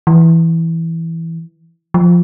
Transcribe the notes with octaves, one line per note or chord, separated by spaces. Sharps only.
E3
F3